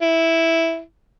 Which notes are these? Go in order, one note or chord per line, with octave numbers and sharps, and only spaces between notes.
E4